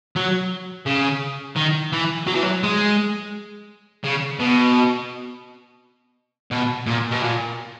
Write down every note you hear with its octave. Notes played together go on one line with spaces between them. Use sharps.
F#3
C#3
D#3
E3
F#3
E3
F#3
G#3
C#3
B2
B2
A#2
B2
A#2